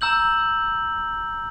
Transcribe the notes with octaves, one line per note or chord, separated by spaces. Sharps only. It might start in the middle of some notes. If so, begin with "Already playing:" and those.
A#5 E6 G6 F#7